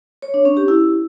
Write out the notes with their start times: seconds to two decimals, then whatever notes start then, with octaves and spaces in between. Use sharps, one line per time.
0.22 C#5
0.34 D4
0.45 C#4
0.57 G4
0.68 E4